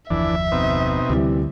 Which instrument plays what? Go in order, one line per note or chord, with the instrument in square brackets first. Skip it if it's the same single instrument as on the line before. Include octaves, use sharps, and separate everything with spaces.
[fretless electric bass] F#1 D#2 F3 [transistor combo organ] E3 D4 [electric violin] E5
[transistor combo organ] B2 C4 D#4
[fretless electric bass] D2 [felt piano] C3 E3 G3